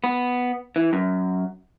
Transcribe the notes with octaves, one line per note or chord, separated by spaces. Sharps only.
B3
E3
F#2